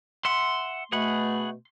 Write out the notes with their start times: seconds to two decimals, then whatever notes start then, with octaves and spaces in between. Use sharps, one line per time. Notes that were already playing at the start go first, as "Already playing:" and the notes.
0.25 E5 F#5 C6
0.92 B2 A3 G#4 F#5 B5